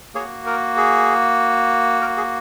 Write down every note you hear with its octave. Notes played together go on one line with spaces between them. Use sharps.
A#3 F#4 G#4 C#5
A#4
G#4
A#4
G#4